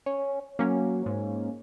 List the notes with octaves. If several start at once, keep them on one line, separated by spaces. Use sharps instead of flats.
C#4
F#3 A#3 C#4
G#2